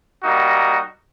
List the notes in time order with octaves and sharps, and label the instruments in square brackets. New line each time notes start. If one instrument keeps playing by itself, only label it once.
[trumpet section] G3 A#3 D#4 F#4